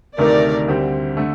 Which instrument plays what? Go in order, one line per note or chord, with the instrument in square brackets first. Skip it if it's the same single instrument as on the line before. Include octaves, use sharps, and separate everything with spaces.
[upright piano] D2 C3 D#3 A3 D#4 [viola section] A#4 D5
[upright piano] D2 D3 G3 C4 G4
D3 A3